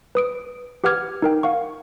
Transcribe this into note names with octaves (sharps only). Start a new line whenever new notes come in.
B4 D#6 D7
G4 B4 F#5 D6 F6 G#6
D#4 A#4 G5
F5 F#5 C#6